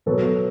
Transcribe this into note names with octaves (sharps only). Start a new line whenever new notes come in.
B2 F#3 B3 A4